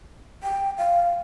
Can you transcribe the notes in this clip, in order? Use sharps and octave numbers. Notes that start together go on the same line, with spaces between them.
G5
F5